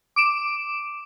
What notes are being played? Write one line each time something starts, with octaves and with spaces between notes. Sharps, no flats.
D6 D7 E7